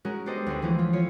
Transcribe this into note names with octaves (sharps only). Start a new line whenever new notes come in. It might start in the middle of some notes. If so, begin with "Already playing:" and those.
G#3 C#4 F#4 A#4
B3 D4 G4 A4 C5 D#5
D2 G#3 C#4
E3 F3 A3 C5
A3 F4
C#4 F4 C#5